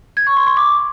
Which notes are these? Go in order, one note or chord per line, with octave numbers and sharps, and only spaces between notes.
G#6
C#6
C6
C6
D6